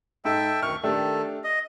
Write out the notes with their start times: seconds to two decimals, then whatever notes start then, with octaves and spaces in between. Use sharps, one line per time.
0.25 G#2 A4 E5 G5
0.62 D2 D#3 C#6 F6
0.84 D#3 A3 D4 G4 A4
1.44 D#5